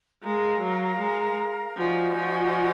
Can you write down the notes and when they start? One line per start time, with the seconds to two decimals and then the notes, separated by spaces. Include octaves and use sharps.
0.23 G#3 A#4 F5 A#5
0.62 F#3
1.00 G#3
1.77 F3 D#4 F#4 D5 G#5
2.16 F3